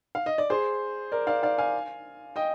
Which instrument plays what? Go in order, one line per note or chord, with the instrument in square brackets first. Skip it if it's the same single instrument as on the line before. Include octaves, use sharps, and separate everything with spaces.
[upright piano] F5
D#5
D5
G#4 C5
A#4 D5
D5 F5
D5 F5
F5 G#5
D#5 G5